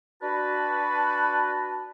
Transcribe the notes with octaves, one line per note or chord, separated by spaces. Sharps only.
D4 F#4 B4 A5